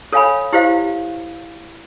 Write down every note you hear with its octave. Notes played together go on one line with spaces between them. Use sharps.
A4 C#5 F5 G#5 B5
E4 G4 C5 F5